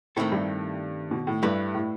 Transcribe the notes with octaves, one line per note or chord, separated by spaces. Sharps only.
A2 D#3 A3 C4 E4 A4
G2
B2
A2
G2 A3 E4 G4 B4
A2